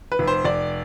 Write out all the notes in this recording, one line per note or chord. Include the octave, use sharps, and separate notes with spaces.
B4
F1
C5
F1 D5